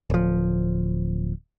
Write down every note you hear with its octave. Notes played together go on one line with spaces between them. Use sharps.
D1 F3